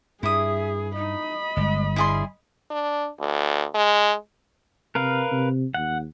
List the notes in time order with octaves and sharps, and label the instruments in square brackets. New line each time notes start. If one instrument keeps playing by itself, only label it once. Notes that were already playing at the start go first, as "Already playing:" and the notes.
[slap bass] G2 [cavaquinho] E4 D#6 [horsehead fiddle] G#4 [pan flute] E5
[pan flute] D#4 [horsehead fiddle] D#5 B5
[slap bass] G1 [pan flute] G#3
[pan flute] G3 [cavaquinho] E4 G#4 C6
[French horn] D4
D2
G#3
[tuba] C3 [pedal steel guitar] A#4 B4 F5
[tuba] C3
[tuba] D#2 [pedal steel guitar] F#5